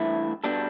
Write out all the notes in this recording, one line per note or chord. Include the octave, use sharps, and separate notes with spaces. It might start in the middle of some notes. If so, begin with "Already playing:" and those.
Already playing: G2 E3 A3 E4
B2 G3 D4 A4